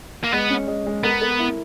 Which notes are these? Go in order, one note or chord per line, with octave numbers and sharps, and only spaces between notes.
A#3
G#3 B3
C#4
G#3
G#3
B3 A#4
A#4
E4